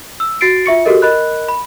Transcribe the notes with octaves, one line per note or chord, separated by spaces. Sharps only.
E6
F#4 A6 C7 D7
F4 E5 C#6 C#7
F#4 G4 A4 A#4 D#5
A#4 D#5 B5 F#6
B5